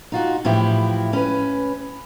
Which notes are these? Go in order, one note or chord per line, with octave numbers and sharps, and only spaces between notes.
D#4 F4 F#4
A2 E3 F3 E4 G4
C#4 B4